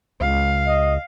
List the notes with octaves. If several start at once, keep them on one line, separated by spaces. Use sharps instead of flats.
C#2 F5
D#5